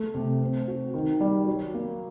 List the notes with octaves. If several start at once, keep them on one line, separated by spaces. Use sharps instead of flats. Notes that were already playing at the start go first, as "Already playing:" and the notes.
Already playing: A3
C3
C4
F#4
D#3
G3
F#3
A#3